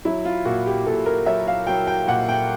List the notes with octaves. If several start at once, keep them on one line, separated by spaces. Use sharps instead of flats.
F#3 E4
F4
A#2 F#4
G4
A#2 A4
A#4
F#3 E5
F5
F#3 G5
G5
A#2 F#5
G5